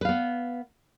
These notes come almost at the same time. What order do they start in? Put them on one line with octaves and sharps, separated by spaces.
B4 F5 B3